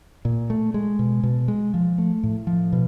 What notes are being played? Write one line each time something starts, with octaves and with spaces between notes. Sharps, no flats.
A#2
A3
G#3
B2
B2
G#3
F3
A3
A2
F3
B2